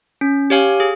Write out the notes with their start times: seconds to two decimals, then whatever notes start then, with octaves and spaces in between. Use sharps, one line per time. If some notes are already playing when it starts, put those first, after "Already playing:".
0.21 C#4
0.50 G4 C#5 F5 G#5
0.80 G#4